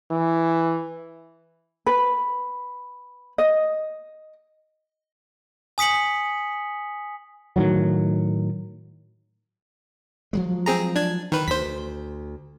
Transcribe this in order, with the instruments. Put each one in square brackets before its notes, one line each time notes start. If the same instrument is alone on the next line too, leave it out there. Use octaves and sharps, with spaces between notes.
[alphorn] E3
[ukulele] B4
D#5
[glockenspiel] G#5 D#6 B6 C#7 F#7
[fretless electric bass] A2 D#3 F#3
[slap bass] F3 F#3 G#3
[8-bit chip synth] C4 G#4 A#5
D4 G#6
D#3 B4
[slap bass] D2 [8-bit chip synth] C5 B6